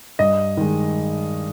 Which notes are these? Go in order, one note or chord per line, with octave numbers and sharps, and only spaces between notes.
G2 D#5
D#3 G#3